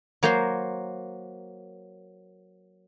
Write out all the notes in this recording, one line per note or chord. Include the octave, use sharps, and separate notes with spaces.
F#3 A#3 C5 A#5 C6